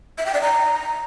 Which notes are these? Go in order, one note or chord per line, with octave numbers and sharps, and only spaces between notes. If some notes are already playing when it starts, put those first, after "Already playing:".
E5
G5
D5
A#5